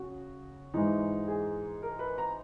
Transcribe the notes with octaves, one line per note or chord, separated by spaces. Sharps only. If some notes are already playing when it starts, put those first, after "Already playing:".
Already playing: C#3 F#4
G#2 E3 G#3 D#4
G#4
A#4
B4
A#5